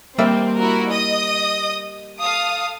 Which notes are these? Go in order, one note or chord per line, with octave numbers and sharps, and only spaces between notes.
G3 A#3 C4 E5
E4 F#4 A#4
D#5 D#6
A4 F5 D#6